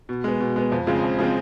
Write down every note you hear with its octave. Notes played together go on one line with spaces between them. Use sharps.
B2
G#3 B3
B2
G#3 B3
F2
C#3 F3 G#3 C4
F2
C#3 F3 G#3 C4